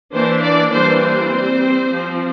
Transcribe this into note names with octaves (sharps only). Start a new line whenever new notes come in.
E3 A#3 D4 C5
D5
E3 G3 A#3 D4 C5
C5
G3 C4
F3 C4